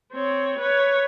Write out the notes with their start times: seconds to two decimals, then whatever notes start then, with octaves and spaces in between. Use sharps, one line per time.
0.12 C4 C#5
0.59 B4 C#5